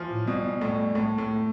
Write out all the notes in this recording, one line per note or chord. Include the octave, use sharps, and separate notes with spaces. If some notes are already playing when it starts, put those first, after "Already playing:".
Already playing: E3 F3
A2
B2 G3
A2
A2 A3
A2